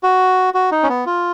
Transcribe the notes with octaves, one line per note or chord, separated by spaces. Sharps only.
F#4
F#4
D#4
C#4
B3
F4